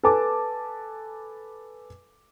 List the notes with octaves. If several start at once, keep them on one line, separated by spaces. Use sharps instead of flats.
A4 B4 G#5 A5 D6